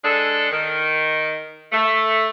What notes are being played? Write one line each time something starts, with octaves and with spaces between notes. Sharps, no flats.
G#3 D4 G#4 A4
D#3
A3